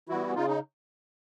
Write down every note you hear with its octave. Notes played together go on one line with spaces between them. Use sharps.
E3 G3 B3 E4 F#4
C#3 D#4 F4
D#4